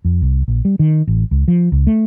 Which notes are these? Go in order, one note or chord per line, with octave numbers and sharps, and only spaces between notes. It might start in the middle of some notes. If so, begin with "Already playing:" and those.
F2
C2
A#1
G3
D#3
A1
C#2
F3
C#2
A3